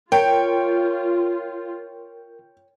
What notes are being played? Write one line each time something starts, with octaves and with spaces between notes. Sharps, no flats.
F4 A#4 C#5 G5